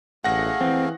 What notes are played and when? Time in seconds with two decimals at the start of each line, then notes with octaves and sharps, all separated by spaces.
0.24 A1 A3 G#4 F5 F#5 A#6
0.61 E3 C4